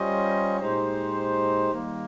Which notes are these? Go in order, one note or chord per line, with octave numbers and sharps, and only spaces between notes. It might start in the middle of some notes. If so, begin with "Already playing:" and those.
Already playing: G3 C#4 F4 C5 D#5
A#2 G#3 D#4 G4 C5
D#3 G3 A#3